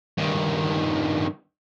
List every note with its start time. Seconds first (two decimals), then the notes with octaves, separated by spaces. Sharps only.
0.18 G2 D#3